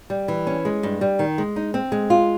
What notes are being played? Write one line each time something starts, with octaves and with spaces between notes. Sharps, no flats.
G3
E3
C#4
G#3
G2
G3
D#3
G#3
D#4
C4
G#3
F4